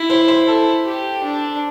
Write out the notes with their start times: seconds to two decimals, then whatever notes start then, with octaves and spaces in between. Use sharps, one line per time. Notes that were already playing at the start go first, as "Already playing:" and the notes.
Already playing: E4
0.10 C5
0.28 C5
0.47 A4
0.86 G4
1.23 D4